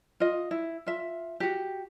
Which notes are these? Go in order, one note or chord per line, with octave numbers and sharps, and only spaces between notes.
F4 D#5
E4
F4 E5
F#4 G4